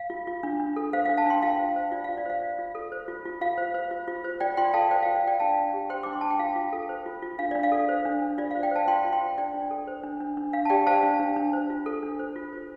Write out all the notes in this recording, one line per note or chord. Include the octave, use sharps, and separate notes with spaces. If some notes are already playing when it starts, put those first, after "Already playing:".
Already playing: F5
F4
F4
D4
D4
A4
C5 F5
F5
D4
F5 A5
D4 G5 C6
F4 F5
C5
C5
F4 D5
F5
F4
D5
C5 F5
F4
F4
A4
C5
F4
F4
F4 F5
C5
C5
F4
F4
C5
F4 D5 G5
F4 G5 C6
A4 F5 A5
C5 D5 G5
F5
F4
F5
F4 D5 G5
D4 F5 A5
D4
G4
C5 G5 C6
D4 D6
C6
D4 A5
G5
F4 F5
F4
A4
C5
F4
F4
D4 F5
D4 D5
F5
A4
C5
D4
D4
F4 D5
F5
C5
D5 G5
C5 F5 A5
F4 G5 C6
F4
G5 C6
C5
D4 D5 G5
D4
A4
C5
D4
D4
D4
D4 F5
A5
G4 D5 G5
C5 F5 A5
D4
D4
D4
C5
F4
A4
D4
C5
F4
C5